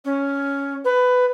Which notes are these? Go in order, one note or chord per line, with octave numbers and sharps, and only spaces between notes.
C#4
B4